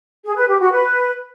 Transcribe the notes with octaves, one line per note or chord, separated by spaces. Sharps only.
G#4
B4
G4
F#4
B4